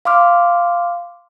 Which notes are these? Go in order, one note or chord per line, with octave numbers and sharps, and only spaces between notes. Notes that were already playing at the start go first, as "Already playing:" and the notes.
F5 C6 D6 F6